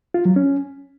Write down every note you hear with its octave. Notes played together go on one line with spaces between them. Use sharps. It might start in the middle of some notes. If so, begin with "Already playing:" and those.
F4
F#3
C#4